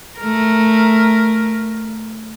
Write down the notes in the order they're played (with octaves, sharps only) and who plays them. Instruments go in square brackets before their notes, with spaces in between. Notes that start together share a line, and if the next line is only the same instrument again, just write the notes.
[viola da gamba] A3 A#4